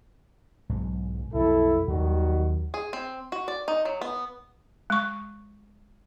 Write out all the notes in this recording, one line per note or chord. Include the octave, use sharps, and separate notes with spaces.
B1 G#2 F#3
B1 F2 E4 A4
D#2 D#3 F#3 G3 F#4
G#4
C4
F#4
D5
D#4
F#3
B3
G#3 C#6